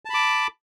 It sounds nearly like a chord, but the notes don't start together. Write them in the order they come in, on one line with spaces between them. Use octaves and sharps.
A5 B5 D6